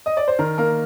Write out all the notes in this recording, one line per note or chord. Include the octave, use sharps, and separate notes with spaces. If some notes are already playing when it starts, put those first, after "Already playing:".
D#5
D5
C5
D#3 A#4
A#3 A#4